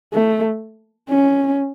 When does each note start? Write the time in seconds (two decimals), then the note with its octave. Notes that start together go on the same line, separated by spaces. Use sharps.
0.13 A3
1.10 C#4